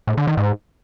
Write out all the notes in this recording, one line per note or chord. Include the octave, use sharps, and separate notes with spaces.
A2
D3
D#3
G#2